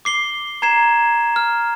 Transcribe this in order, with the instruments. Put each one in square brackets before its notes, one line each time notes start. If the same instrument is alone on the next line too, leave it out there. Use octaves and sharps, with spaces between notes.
[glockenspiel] D6 C7 G7
A#5 G#6 C7 E7
F6